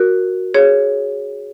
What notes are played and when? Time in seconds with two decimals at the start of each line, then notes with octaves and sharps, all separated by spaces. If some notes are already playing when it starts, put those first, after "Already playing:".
Already playing: F#4 A#4
0.54 G#4 C#5